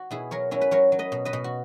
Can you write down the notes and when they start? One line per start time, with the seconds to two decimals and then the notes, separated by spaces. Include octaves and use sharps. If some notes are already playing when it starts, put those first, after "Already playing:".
Already playing: F#4
0.11 B2 E4 G#4
0.31 F#3 A#4 C#5
0.51 F#3 C#4 E4
0.61 B4
0.71 F#3 A#4 C#5
0.92 F#3
0.99 B4 D#5
1.12 B2
1.25 B4 D#5
1.33 B2
1.44 F#4